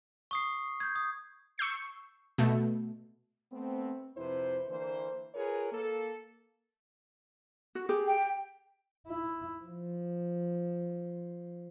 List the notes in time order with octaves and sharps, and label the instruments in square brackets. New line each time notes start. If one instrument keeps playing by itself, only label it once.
[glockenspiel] C#6 D#6 C7
G6 G#6
D#6
[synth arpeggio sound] C#6 E6 G6 C7
B2 A3
[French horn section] A3 B3 C4
F2 C3 E4 B4 C5
D3 E3 A#3 C5
F4 G#4 A#4 B4 C#5
A#3 A4
[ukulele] F#4
G4 G#4
[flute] G5
[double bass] E4
F3